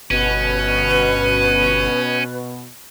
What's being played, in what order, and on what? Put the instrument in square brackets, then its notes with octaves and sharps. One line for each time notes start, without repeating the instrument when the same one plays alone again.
[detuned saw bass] G1 [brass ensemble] B2 [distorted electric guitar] C#4 [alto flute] B4